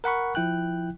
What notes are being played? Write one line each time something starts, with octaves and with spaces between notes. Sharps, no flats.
A#4 F#5 B5 C#6
F3 E4 G5 F#6